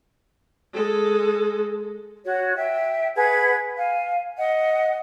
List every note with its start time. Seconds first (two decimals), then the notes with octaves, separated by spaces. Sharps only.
0.73 G#3 A4
2.24 F#4 C#5
2.56 E5 G5
3.16 G#4 B4 F#5 G#6
3.76 F5 G#5
4.37 D#5 F#5